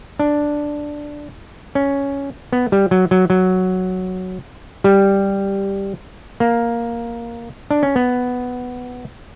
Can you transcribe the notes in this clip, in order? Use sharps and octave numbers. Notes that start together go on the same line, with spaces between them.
D4
C#4
B3
G3
F#3
F#3
F#3
G3
A#3
D4
C#4
B3